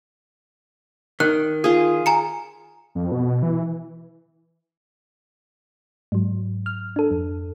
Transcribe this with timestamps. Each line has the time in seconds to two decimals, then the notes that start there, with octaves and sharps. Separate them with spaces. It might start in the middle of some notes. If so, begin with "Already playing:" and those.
1.20 D#3 F#6
1.64 F4 G#4
2.06 G#5 A#5 C#7
2.95 F2
3.12 B2
3.42 E3
6.12 G#2 F#3
6.66 F6
6.96 D4 A4
7.11 F2